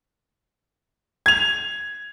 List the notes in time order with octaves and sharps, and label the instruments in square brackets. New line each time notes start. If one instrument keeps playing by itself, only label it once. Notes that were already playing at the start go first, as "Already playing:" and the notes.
[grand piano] G#6 F7